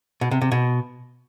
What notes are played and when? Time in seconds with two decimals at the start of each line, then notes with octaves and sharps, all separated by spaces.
0.21 B2
0.31 C3
0.41 C3
0.52 B2